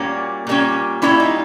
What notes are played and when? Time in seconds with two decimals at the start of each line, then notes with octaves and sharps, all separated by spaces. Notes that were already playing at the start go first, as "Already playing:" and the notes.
Already playing: A#2 G3 A#3 C#4 F#4
0.47 A#2 G3 A#3 C#4
1.02 A#2 G3 A#3 C#4 E4
1.20 D#4